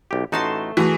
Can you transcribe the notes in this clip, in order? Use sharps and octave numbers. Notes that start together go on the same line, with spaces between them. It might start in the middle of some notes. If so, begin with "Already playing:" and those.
B1 G4
A1 A3 D#4 F#4 A5 C6
E3 A3 F#4 G#4